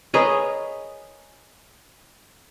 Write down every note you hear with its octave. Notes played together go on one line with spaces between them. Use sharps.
G#4 A#4 B4 C#5 D#5